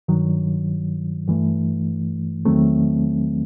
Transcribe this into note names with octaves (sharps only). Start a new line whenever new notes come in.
G2 D#3 F#3
G2 E3 A3
E2 D#3 F#3 A3 C4